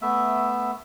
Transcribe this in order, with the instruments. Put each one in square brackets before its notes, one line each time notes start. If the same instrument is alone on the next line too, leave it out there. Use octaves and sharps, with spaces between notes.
[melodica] A3 B3 E5